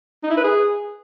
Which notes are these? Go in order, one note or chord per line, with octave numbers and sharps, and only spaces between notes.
D#4
E4
B4
G#4